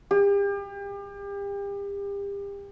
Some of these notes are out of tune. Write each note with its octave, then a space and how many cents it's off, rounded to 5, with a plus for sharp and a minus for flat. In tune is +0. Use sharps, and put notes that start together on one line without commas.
G4 +35